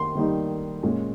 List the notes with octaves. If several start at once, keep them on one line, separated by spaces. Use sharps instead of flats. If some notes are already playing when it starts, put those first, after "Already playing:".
Already playing: D#3 A#3 C6
D#3 G3 A#3 D#4
A#2 G#3 C#4